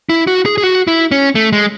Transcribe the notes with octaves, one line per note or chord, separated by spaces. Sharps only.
E4
F#4
G#4
G#4
F#4
E4
C#4
A3
G#3